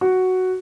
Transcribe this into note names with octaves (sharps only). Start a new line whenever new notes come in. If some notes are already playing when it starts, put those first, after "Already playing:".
F#4